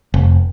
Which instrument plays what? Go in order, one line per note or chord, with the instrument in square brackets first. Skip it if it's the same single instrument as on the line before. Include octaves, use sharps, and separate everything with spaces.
[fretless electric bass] F1